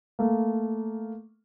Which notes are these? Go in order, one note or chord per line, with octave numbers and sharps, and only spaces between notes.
A3 A#3